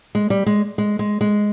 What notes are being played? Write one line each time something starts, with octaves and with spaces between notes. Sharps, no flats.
G#3
G3
G#3
G#3
G#3
G#3